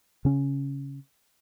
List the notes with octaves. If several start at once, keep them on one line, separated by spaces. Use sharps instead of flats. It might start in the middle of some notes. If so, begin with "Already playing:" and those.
C#3 C#4